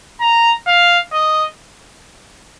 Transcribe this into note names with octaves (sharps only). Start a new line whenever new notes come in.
A#5
F5
D#5